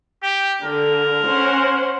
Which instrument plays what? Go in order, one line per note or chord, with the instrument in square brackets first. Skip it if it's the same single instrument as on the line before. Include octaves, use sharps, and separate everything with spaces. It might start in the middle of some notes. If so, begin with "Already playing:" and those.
[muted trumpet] G4
[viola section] D3 [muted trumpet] A#4
[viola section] C#4 C5 F#5